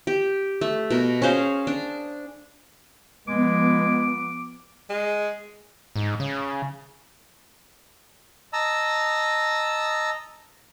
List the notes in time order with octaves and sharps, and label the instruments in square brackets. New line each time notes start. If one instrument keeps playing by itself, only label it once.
[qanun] G4
A3
B2 A#4
C#4 G#4 C5 F5
D4
[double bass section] F3 B3 [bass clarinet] G#3 [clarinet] D6
[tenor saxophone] G#3
[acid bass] G#2
C#3
[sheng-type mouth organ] D#5 A5 A#5 E6